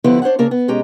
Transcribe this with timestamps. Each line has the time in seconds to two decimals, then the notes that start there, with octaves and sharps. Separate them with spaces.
0.04 D3 F3 B3 E4 G4 B4
0.22 D4 C5 C#5 E5 F#5
0.39 C#3 A#3 D4 A#4
0.51 B3
0.68 B2 G#3 C#4 G4 A#5